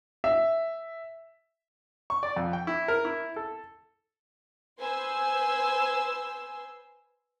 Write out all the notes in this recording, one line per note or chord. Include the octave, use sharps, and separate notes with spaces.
E5
C#6
D5
F2
G5
E4
A#4
E4
A4
B4 C5 G#5 C6 E6